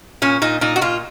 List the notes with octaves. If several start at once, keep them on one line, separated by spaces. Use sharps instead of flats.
A#2 C#4
A#2 D#4
A#2 D#4
F#4
A#2 F4